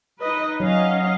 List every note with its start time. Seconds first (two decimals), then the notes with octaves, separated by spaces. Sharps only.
0.22 D#4 B4 D#5
0.60 F#3 C#4 D#5 F5